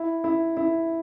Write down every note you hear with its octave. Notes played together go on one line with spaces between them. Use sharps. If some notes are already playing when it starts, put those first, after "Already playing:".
Already playing: E4
E4
E4